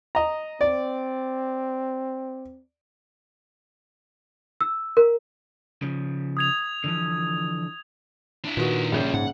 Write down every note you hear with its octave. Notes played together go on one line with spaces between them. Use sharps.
D#5 A#5
C4 D5
E6
A#4
C#3 F3
D#6 G#6 F7
D3 E3 F3
D4 E4
A#2 D#3 F#4 B4
A#1 C#3 G3 C#4 G6
G#2 F#5